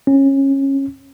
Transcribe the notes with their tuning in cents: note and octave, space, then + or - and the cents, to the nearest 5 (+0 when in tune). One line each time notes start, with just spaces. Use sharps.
C#4 -20